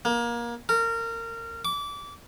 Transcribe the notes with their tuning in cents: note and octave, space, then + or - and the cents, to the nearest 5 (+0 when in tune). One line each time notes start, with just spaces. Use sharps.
A#3 +25
A#4 -25
D6 -25